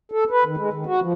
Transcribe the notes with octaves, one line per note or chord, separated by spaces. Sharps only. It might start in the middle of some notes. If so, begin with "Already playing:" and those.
A4
B4
D#3
G#3
D#3
F#4
F3